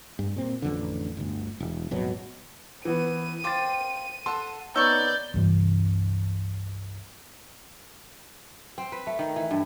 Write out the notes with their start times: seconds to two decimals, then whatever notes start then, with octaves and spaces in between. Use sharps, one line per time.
0.19 G2
0.36 A#2 C4
0.62 A1 F2 D3
1.17 G1 D2
1.60 E1
1.91 D#1 G#1 B2 F#3
2.85 E3 B3 D#7
3.44 F4 C5 G5 D6 A6
4.26 A4 F#5 A5 C6
4.75 B3 D#4 C#5 D5 C#6 E6 G6
5.34 C2 G2 E3
8.78 C4
8.92 B4
9.07 A3
9.19 D#3
9.36 E3
9.51 G2